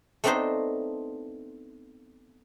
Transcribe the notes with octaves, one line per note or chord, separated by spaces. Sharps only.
A3 B3 C4 D4 D#4 C5